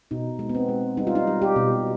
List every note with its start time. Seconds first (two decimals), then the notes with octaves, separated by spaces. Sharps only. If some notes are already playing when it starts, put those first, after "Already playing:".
0.11 B2 D#4
0.39 G#3
0.49 B3
0.55 C4
0.69 G#3
0.97 G3 D#4
1.07 F4
1.15 D#4
1.27 G3
1.42 G4
1.56 B2